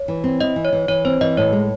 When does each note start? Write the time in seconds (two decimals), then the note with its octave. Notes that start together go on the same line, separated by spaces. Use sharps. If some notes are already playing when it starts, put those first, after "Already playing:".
Already playing: C#5
0.08 E3
0.24 C4
0.40 E4 D#5
0.56 E3
0.65 C#5
0.73 E3
0.88 E3 C#5
1.05 C4 C5
1.21 E3 D#5
1.37 A2 C#5
1.53 G#3